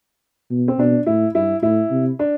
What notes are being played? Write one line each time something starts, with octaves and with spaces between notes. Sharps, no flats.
B2
C4
B2 D4
A2 E4
G2 E4
A2 E4
C3
D4